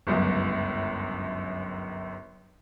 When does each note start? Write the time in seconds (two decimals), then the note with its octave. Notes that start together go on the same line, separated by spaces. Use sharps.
0.07 G1 C#2 F#2